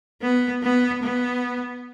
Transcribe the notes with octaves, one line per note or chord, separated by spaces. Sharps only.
B3
B3
B3